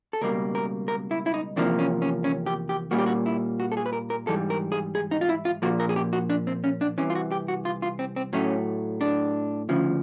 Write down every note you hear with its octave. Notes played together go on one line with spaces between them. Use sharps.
A4
C#2 B2 G3 A#3 A#4
A#4
A#4
E4
E4
D#4
E2 C3 F3 A#3 D4
C#4
C#4
C#4
G4
G4
A#2 G3 A#3 F#4
G4
F#4
E4
F#4
A4
G#4
B4
A#4
A#4
G#2 E3 G3 A4
A#4
G#4
G#4
D#4
F4
E4
F4
A#2 F3 A#3 F#4
A#4
G#4
G4
F#4
D4
C4
C#4
D4
C2 C3 E3 C#4
F4
F#4
G4
F#4
F4
F4
C4
C4
A2 F#3 A3 C#4
D4
D2 C#3 F3